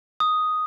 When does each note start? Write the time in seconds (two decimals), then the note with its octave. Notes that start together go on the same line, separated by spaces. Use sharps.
0.20 D#6